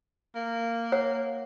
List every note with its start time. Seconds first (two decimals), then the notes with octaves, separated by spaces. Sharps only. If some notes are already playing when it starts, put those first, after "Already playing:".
0.36 A#3
0.92 C#5 F#5